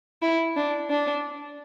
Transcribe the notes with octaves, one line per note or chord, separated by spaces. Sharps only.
E4
D4
D4